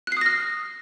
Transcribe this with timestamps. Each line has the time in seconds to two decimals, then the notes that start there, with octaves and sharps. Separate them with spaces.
0.07 F#6
0.12 C7
0.17 D#6
0.21 A#6
0.26 F6